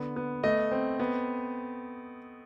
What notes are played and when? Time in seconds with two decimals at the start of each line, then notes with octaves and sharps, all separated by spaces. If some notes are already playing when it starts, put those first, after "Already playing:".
Already playing: D3 B3
0.16 B3
0.44 A3 D#5
0.71 C4
0.99 B3